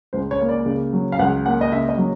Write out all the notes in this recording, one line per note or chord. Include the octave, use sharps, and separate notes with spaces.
C#2 C5
C#5
A#3
D5
C#3
F#3
F5
C#2 F#5
A#3 F#5
D#5
C#3 E5
D#5
F#3